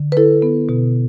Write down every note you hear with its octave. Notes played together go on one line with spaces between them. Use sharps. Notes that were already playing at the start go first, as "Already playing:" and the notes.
Already playing: D3
B4
E4 A4
B3
B2